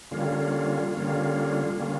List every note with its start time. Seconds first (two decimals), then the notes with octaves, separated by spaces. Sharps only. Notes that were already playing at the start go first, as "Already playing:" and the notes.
0.11 D3 G3 A#3 C#4 F4
0.95 D3 G3 A#3 C#4 F4
1.80 D3 G3 A#3 C#4 F4